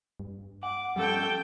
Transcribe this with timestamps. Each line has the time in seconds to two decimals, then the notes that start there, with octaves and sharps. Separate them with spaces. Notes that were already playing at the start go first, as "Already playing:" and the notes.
0.20 G2
0.63 F#5 D6
0.96 F3 G3 C#4 A4 G5